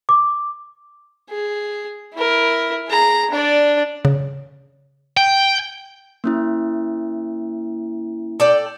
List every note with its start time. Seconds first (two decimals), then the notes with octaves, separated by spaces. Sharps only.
0.09 D6
1.30 G#4
2.14 E4 A#4
2.89 G#4 A#5
3.31 D4 D5
4.05 C#3
5.17 G5
6.24 A#3 C#4 E4
8.40 A4 D5 G5